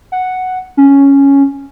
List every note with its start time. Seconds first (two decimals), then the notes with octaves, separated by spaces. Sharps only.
0.12 F#5
0.77 C#4